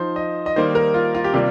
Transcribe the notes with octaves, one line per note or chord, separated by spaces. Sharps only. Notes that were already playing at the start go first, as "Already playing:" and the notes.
Already playing: F3 D#4 C5
D#5
D#5
D#3 G3 A#3 D#4 C5
A#4
F4
F4
G4
C3 G3 A#3 F4